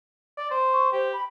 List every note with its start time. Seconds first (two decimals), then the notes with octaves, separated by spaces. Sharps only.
0.37 D5
0.51 C5
0.73 C#6
0.92 G4 C5
1.13 B5